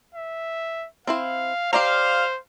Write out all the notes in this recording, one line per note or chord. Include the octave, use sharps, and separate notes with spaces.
E5
C4 E4 C5 F5
G4 C5 D5 F5 A#5